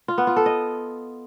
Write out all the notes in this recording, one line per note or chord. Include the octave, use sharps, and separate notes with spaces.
F4
B3
F4
A4
D#5